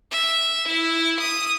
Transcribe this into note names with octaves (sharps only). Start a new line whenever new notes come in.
E5
E4
D#6